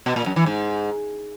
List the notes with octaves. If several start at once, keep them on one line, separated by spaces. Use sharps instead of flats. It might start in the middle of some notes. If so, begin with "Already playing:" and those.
B2
A#2
F#2
E3
G#2